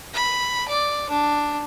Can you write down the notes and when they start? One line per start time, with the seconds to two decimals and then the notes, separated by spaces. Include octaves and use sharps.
0.14 B5
0.68 D5
1.09 D4